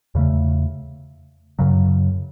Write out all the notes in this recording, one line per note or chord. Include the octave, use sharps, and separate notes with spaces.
E2 C#3 A3
F#2 C#3 F#3